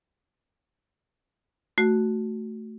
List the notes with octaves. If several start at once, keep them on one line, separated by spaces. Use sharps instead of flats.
A3 F#4